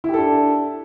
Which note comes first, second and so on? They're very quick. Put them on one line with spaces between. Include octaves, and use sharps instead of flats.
E4 G4 A4 D4